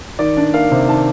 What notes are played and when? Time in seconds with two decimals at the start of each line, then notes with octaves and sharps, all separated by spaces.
0.19 D#3 D5
0.37 D4
0.54 A#3 F5
0.72 C3
0.89 D#3 A5